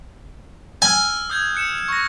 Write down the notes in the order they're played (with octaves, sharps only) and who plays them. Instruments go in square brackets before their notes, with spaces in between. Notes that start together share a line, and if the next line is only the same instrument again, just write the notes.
[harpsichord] G#5 [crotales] E6 F6
[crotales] D#6 G6 G#6
F#6 C#7 E7
C#6 A#6